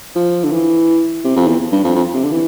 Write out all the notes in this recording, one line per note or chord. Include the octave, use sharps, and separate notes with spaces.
F3
D3
E3
C3
F2
E2
G2
F2
F2
C3
D3
E3